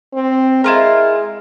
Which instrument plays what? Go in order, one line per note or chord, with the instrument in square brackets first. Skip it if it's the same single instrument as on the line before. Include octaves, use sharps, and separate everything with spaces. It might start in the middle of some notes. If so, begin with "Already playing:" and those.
[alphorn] C4
[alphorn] G#3 [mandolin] E4 F4 A#4